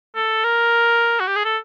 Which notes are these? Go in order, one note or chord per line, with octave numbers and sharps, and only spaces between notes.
A4
A#4
F#4
G4
G#4
A4